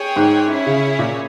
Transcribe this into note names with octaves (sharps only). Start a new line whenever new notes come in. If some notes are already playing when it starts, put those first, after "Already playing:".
Already playing: G#4 C#5 G5
G#2
C#4 E4 G#4 C#5
C#3
A#2